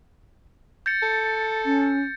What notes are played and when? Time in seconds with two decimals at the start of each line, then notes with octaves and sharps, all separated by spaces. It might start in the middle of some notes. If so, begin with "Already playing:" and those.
0.86 G6 A6 C#7
1.03 A4
1.65 C#4